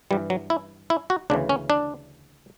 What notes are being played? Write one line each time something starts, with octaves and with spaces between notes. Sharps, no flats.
G2 E3 G3
F#3
E4
E4
F#4
D2 C#3 E3 D4
C#4
D4